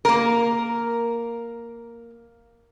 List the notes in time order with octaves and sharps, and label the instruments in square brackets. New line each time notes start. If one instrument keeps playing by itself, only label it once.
[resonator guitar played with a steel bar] A#3 A#4